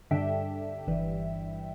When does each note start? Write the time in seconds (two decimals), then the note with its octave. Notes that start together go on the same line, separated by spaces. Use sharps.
0.11 G2 D3 G3 D4 E5 G5
0.87 G1 G2 E3 G3